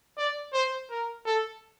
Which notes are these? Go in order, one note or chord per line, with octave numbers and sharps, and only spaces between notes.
D5
C5
A#4
A4